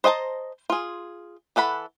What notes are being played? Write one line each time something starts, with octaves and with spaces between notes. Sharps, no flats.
C5 D#5 G5 A5 A#5
F4 G#4
E3 A4 F#5 B5